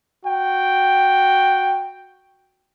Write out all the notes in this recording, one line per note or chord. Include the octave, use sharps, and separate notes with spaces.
F#4 G5